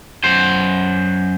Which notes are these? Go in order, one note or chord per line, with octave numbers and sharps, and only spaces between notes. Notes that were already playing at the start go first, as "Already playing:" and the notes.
F#2 C5